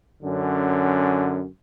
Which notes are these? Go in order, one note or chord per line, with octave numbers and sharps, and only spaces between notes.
F#2 D3 C#4